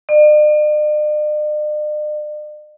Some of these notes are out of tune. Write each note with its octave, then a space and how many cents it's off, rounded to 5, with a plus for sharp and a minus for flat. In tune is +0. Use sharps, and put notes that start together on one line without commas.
D5 +45